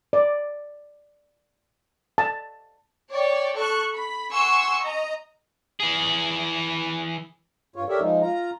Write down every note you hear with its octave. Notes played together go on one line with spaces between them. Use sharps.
D5
A5
C#5 D5 G5
A4 C#6 F#6
B5
F#5 G#5 C6 C#6 E6
D#5 A#5
E3 G#4
G2 F4 C#5
G4 A4 A#4 C#5 D5 E5
F3 G#3 D#4
F4 A#5